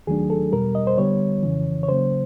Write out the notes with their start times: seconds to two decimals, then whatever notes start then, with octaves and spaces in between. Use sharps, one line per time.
0.07 D#2 D#3 F#3 A3 D4 G#4
0.30 A4
0.52 E2 B2 G3 A#4
0.75 D#5
0.87 C5
0.98 D3 G3 B3 C#5
1.43 F2 C#3 E3
1.83 C#5
1.88 C#3 F#3 A#3 C5